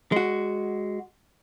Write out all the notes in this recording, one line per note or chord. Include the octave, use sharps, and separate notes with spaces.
G#3 F#4